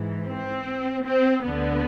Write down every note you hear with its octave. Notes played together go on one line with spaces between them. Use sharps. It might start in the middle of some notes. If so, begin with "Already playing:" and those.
Already playing: G#2 E3
C4
C4
D2 D3 B3